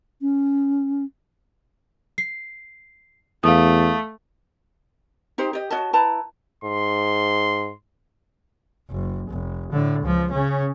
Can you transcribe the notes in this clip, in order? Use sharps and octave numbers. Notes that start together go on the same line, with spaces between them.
C#4
C7
E2 A3 F5 D#6
D#4 G4 C5
G4 D#5
F#4 C#5 D#5 A5
E4 B4 A5 A#5
G#2 C6
F#1
F1
A2 D3
C#2 F3
C#3 C#4